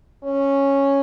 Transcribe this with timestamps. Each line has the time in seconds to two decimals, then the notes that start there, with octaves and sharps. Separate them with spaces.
0.24 C#4